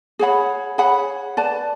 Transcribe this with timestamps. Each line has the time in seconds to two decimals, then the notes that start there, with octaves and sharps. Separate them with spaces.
0.19 G#4 C#5 F#5 B5
0.78 G#4 C#5 F#5 B5
1.37 B4 D5 A5